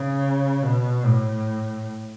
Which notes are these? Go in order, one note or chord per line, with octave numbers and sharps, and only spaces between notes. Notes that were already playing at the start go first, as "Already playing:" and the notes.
Already playing: C#3
B2
A2